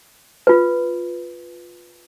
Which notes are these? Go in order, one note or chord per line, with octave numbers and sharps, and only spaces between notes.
F4 B4